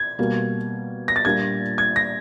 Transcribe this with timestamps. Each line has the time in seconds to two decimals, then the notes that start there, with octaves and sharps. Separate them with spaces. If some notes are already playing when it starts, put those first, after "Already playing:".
Already playing: G#6
0.19 B2 G3 A#3
1.08 A#6
1.16 A6
1.25 A#2 G3 A#3 D4 G#6
1.78 G#6
1.96 A#6